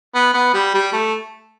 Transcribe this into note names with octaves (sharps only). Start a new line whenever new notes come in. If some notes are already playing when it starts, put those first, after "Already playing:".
B3
B3
G3
G3
A3